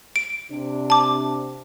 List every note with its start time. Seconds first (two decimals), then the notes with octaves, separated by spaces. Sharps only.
0.16 D7
0.51 C3 D4
0.90 A5 D6